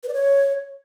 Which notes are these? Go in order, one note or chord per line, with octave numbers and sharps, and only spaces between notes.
B4
D5
C#5